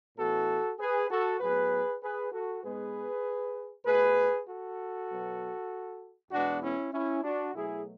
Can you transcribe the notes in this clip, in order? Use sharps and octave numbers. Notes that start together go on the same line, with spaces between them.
A2 E3 B3 F#4 A4
G#4 B4
F#4 A4
A2 F#3 B3 G#4 B4
G#4 B4
F#4 A4
G#2 G#3 B3 G#4 B4
B2 A3 G#4 B4
F#4 A4
B2 F#3 B3
E2 B2 G#3 B3 D4 F#4
C#4 E4
C#4 E4
D4 F#4
B2 F#3 A3 E4 G#4